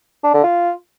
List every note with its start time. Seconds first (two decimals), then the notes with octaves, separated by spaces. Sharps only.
0.24 D4
0.34 D3
0.44 F4